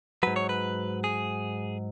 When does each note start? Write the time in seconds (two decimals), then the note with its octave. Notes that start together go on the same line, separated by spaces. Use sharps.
0.23 G#2 F#3 B4
0.36 C#5
0.49 B4
1.04 G#4